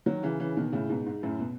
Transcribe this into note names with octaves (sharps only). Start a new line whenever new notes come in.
D#3 F#3
C#3 E3
C#3 E3
B2 D#3
A2 C#3
G#2 B2
G#2
F#2 A2
B2